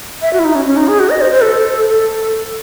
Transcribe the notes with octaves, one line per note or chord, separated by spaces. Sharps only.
E5
F#4
E4
D#4
C#4
C#4
D#4
G#4
F#4
D#5
C5
C5
A4
A4